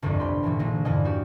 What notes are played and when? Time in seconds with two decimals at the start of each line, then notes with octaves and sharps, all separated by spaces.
0.02 G1 C2 F2 G#3 G#4 D6
0.19 G2 G4 B5 C6
0.43 D2 A#2 E3 F#3
0.59 A#1 G#3 D#4 A#5
0.85 E2 G2 A#2 D3 D#5 G#5
1.04 G3 F#4 G4